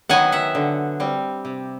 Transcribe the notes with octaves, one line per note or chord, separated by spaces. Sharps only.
D#3 F#3 B3 F#5 G#5
E5 F#5
D3
G3 C4
C3